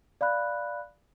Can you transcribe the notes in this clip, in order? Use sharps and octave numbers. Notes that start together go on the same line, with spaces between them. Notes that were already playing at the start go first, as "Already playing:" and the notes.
D5 F5 B5 F#6